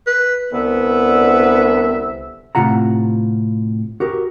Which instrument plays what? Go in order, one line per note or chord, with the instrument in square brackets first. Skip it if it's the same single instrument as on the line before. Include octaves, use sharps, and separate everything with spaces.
[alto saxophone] B4
[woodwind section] C2 D3 E5 [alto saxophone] B3
[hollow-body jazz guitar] A2 C3 F4 F#5 A#5
F#4 G4 A#4